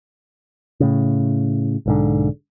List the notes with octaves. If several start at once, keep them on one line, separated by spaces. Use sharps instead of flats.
A2 C#3
B1 G#2 D3